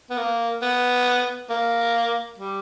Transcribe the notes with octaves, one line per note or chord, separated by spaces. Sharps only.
B3
A#3
B3
A#3
G3